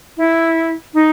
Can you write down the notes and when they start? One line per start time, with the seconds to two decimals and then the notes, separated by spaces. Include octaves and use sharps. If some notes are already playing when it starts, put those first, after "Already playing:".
0.17 E4
0.94 D#4